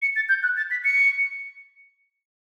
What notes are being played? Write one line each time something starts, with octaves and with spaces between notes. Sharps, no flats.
C#7
A6
G6
F#6
A6
B6
C#7